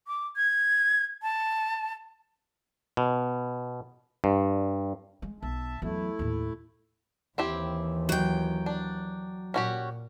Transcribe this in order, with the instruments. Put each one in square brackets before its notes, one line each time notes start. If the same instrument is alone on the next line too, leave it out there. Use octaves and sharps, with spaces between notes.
[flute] D6
G#6
A5
[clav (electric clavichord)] B2
G2
[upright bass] G#3
[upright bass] B1 [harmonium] E5 A5
[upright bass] E2 F#3 [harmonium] A3 E4
[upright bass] D#2 A2
[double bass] D#2 E3 [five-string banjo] C4 E4 G4
[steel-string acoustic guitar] F#3 G5
[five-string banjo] D4
[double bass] A#2 [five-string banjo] C#4 F#4 G4